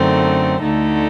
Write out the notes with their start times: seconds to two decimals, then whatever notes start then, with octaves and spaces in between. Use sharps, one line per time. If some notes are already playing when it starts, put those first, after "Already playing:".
Already playing: F#2 D3 A3 C4 D#4
0.61 D2 D3 A3 D#4 A4